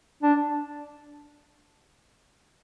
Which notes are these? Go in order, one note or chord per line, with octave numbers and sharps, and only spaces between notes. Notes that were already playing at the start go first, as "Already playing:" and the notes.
D4